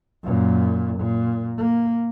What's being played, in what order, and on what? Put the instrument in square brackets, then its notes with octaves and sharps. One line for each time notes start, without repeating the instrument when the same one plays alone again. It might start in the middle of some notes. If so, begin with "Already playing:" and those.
[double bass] F#2 A#2
A#2
A#3